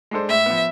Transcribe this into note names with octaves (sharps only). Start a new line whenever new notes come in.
G#3 D4 A4 C5
A2 E5
F3 B3